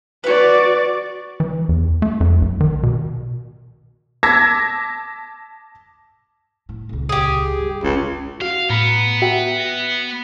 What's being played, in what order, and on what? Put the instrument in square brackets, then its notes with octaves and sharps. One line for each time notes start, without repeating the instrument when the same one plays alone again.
[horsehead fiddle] F#4 D5 [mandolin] B4 C#5
[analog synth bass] E3
E2
A3
F2
B1
D#3
B2
[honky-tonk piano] A5 D6 E6 G#6 A#6 B6
[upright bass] A2
D#1 C#2
[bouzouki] G4 G#4
[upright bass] G2
[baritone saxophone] C#2 [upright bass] D#3 G#3
[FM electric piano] F#4 [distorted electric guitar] F5
[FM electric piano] A2 A#5 B5 [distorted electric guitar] B3
[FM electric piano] F#4 E5 G5
A#6